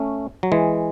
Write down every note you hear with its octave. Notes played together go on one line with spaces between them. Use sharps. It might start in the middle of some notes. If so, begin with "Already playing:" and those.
Already playing: A3 C#4
F#3
E3 G#3